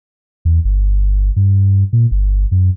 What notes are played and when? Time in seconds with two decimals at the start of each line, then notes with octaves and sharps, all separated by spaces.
0.45 E2
0.64 G1
1.36 G2
1.93 A#2
2.11 G1
2.52 F#2